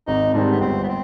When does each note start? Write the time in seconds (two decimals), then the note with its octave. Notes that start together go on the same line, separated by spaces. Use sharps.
0.07 G#1 D#4
0.34 G#2 D#3 G3 C4 D4
0.51 B3
0.61 G1 C4
0.83 B3
0.88 C4